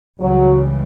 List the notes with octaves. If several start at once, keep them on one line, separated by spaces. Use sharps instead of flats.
C#2 C#3 E3 F#3 G3